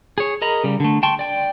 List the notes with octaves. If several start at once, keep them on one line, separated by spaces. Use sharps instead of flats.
G#4 C#5
G#4 A#4 D#5 A#5 B5
C#3 G3
D3 A3
G5 A5 C6 C#6
D5 G5